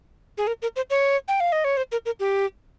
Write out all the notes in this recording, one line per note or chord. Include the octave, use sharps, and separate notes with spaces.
G#4
A#4
A#4
C5
C#5
G5
F5
D#5
C#5
C5
A#4
A#4
G4